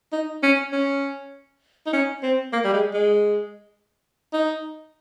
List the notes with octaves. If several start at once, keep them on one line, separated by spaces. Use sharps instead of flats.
D#4
C#4
C#4
D#4
C#4
C4
A#3
G3
G#3
G#3
D#4